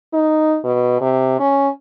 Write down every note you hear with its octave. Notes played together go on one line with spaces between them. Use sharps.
D#4
B2
C3
C#4